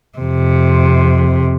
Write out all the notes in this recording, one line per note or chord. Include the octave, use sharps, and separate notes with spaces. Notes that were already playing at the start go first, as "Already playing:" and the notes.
F2 C3